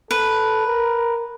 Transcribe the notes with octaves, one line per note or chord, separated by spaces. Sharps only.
A4 B4
A#4